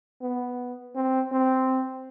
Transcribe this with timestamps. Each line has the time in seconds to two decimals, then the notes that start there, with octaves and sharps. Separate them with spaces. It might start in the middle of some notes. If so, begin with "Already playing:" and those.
0.22 B3
0.95 C4
1.32 C4